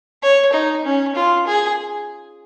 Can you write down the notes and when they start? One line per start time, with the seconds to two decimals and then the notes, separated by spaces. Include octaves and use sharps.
0.22 C#5
0.53 D#4
0.85 C#4
1.15 F4
1.47 G#4